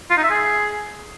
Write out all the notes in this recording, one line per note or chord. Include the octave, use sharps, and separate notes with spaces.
F4
D#4
E5
G#4